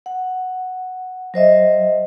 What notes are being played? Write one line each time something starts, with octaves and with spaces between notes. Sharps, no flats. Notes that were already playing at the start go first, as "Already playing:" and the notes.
F#5
F#3 C5 D#5 E5